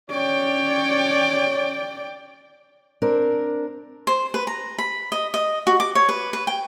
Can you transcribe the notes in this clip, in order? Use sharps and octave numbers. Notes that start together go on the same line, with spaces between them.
C#4 C#5 D5 G5
C4 D4 A#4
C5
B4
A#5
B5
D#5
D#5
F#4
D6
C#5
B4
B4
G5